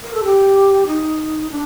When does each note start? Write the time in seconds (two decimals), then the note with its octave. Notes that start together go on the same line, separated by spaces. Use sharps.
0.03 A#4
0.14 A4
0.24 G4
0.87 D#4
1.51 D4